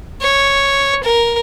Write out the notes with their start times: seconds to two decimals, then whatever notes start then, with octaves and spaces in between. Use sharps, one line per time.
0.21 C#5
1.03 A#4